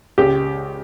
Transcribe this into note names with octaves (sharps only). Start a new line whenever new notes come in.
C#2 G4